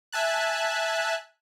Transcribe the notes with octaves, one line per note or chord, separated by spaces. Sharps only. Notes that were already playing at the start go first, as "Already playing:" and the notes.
E5 G#5 A5 F#6